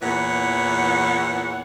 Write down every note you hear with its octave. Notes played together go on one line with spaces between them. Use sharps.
E2 A#2 E3 C#5 F#5